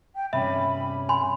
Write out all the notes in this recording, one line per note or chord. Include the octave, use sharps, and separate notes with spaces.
G5
G2 C3 C#4 E5 B5
G#5 B5 C6